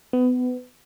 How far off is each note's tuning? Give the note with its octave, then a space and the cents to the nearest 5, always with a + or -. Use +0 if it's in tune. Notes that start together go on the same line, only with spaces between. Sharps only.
B3 +25